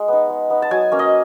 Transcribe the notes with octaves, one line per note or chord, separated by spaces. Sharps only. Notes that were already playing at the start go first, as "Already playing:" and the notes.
Already playing: G#3
B3 D#4
G#3
B3 D#4
A5
F#3 G#5
A#3 C#4
D#5